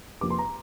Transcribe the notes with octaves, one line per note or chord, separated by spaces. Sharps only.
F2 C3 F3 A#3 D6
C6
A#5